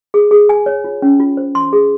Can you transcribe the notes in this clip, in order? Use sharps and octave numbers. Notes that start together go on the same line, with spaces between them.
G#4
G#4
G#5
C#5
F4
C#4
F4
C5
C6
G#4